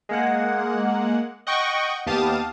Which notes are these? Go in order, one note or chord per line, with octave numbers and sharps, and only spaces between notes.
G#3 A#3 F#5
D#5 F#5 G5 C#6
D#2 B3 G4 F5 A5 D#6